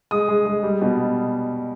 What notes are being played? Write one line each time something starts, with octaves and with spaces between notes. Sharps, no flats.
G#3 D#6
G#3
G#3
G3
B2